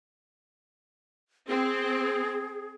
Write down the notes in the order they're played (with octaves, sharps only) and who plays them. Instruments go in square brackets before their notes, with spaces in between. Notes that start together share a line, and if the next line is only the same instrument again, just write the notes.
[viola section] C4 [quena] G#4